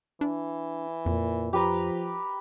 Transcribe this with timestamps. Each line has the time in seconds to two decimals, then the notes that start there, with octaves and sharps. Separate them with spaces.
0.21 E3 D4
1.06 F2 A#2
1.53 F3 G4 B4 A#5